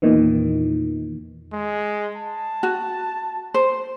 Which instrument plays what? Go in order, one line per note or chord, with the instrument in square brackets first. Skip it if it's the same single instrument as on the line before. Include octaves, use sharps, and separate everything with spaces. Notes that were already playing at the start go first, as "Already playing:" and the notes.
[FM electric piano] E2 A#2 D#3 E3
[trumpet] G#3
A5
[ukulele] F#4
C5